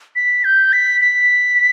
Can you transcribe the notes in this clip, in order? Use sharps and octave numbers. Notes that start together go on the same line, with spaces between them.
B6
G6
B6
B6